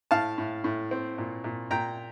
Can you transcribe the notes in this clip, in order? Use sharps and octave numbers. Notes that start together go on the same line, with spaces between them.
A2 F5 A5
A2
A2
C4
A#2
A#2
A#2 G5 A#5